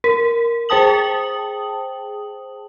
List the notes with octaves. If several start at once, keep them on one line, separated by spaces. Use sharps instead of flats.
A#4
G#4 C5 G5 A5 D#6 F#7